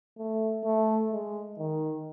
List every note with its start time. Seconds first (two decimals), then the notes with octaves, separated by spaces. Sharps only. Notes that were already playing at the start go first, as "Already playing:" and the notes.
0.18 A3
0.64 A3
1.12 G#3
1.58 D#3